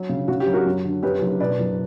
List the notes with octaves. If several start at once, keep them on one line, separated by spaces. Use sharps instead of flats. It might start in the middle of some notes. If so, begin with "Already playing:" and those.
Already playing: F#3
C#3
C#3 F#4
G4
F#3
F#4 A#4
F#2
D3
F#2 G4 B4
F#1
B2 B4 D5
F#1